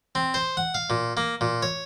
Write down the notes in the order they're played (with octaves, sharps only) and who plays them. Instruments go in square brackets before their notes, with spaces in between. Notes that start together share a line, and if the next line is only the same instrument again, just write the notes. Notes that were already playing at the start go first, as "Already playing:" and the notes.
[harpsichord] C4
C5
F#5
F5
A#2
A#3
A#2
C#5